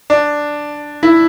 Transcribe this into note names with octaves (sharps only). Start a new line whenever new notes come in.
D4
E4